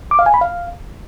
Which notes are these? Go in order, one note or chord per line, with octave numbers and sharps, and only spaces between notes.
D6
F5
G#5
B5
F5